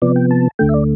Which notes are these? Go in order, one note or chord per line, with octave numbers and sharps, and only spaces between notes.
C3 F3 B3 D5
G5
A5
D2 D3 A3 G5
E5
D5